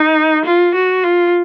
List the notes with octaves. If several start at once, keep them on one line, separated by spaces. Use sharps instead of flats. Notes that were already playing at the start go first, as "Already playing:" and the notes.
Already playing: D#4
F4
F#4
F4